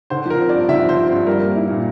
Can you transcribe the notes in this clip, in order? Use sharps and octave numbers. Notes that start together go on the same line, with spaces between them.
D3 C5
F3 A#4
C4
D5
G2
D3 E5
F3
C5
C4
G2 C5
G3 A#4
A#3
E4
A#2